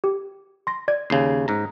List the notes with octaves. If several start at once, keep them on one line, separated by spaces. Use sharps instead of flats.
G4
C6 A#6
D5 G#6
D#2 C#3 C7
G#2 A#5